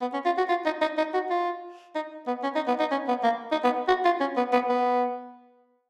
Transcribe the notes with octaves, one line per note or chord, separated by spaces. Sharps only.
B3
C#4
F4
F#4
F4
D#4
D#4
D#4
F#4
F4
D#4
B3
C#4
D#4
B3
D#4
C#4
B3
A#3
D#4
B3
F#4
F4
C#4
B3
B3
B3